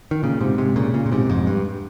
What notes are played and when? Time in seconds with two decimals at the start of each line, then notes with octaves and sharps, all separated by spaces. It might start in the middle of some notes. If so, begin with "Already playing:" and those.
0.11 D#3
0.23 A#2 C#3
0.41 G#2 C3
0.58 G#2 C3
0.76 A#2 C#3
0.94 A#2 C#3
1.06 A#2
1.12 G#2 C3
1.25 A#2
1.29 F2 G#2
1.47 G2